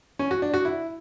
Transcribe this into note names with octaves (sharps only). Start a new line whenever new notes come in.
C#4
F#4
D4
F#4
E4